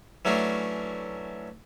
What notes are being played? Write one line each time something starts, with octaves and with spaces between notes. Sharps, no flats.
E3 F#3 A3 C#4 D4